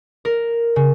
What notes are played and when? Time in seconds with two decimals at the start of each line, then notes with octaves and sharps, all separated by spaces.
0.25 A#4
0.76 C#3